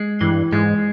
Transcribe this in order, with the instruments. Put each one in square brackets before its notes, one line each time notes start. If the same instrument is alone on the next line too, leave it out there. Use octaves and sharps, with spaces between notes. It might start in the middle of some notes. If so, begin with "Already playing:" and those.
Already playing: [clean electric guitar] G#3
[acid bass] G2 [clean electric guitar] E3
[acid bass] G#2 [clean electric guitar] G#3